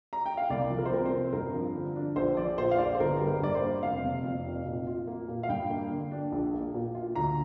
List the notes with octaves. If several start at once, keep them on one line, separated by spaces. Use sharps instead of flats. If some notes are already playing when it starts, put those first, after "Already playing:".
A#5
G5
F5
C2 D5
F3
A#4
C5
C3 A#4
C5
C4
G2 A#4
F3
D3
D4
A#1 C5
F3 D5
A#2 C5
F5
A#1 D5
C5
G1 A#4
G3
A#4
G2 D5
C5
A#3
F1 F5
C3
F2
F1
A#2
F4
A#3
A#2
F5
G2 G5
A#3
D3
D4
A#1
A#3
A#2
F4
D2 A#5